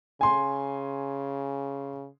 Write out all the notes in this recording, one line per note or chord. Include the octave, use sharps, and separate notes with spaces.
C#3 G#5 C6